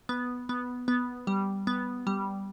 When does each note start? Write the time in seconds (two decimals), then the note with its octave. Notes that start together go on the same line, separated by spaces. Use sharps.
0.09 B3
0.49 B3
0.88 B3
1.27 G3
1.67 B3
2.07 G3